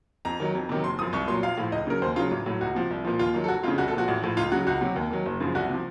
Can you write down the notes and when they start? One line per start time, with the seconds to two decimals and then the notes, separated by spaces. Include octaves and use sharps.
0.25 F2 A#5
0.40 D#3 F#3
0.55 F2
0.69 C3 D#3 F#3
0.84 F#1 C6
0.99 F3 D#6
1.02 F#2
1.13 C2 C#6
1.28 A#2 F#3 C6
1.43 A#1 F5
1.58 A2 F3
1.72 C#2 D#5
1.87 C#3 F#3 A#4
2.02 D#2 C5
2.16 C#3 F#3 F4
2.31 A1
2.46 A2 F#3
2.61 C#2 F#4
2.75 C3 F3
2.90 C2
3.05 A#2 F3
3.19 D#2 F4
3.34 D#3 F#3
3.44 A4
3.48 F1 F#4
3.63 F2 C#3 F4
3.78 C2 F#4
3.88 A4
3.93 A#2 F3 F#4
4.08 A1
4.22 A2 F3
4.37 C#2 F4
4.52 C#3 F#3 F#4
4.66 C#2 F#4
4.81 C3 F#3
4.96 D#2
5.11 D#3 F#3
5.26 F#1
5.40 F#2 C#3 F3
5.55 C2 F#4
5.69 C3 F3